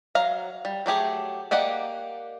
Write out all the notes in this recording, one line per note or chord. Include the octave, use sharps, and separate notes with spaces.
F#3 F5 A#5
G3
F#3 A3 G4 G#4
A#3 G4 D5 D#5 F#5